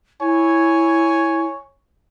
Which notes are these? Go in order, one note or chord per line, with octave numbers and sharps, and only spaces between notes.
E4 C#5 G#5